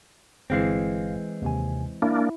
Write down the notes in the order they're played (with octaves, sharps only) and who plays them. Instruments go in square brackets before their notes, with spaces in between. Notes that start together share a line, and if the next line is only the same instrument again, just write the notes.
[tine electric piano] G1 F5 C7 [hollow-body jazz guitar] E3 G#3 C4
[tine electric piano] D#2 C3 G#5
[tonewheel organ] A#3 D4 [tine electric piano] E4